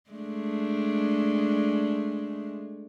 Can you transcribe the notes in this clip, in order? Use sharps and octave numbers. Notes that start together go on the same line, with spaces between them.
G#3 A3 D4